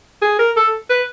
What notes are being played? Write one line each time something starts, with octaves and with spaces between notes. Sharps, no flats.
G#4
A#4
A4
B4